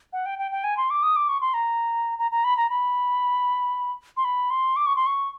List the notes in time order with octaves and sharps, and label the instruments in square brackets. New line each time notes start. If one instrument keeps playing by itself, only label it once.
[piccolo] F#5
G5
G5
G5
G#5
C6
D6
D#6
D6
C#6
C6
A#5
A#5
A#5
B5
A#5
B5
C6
B5
C6
D6
C#6
C6
C#6